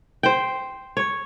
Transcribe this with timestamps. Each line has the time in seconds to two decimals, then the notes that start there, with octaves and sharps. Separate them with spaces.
0.23 C5 G5
0.97 C#5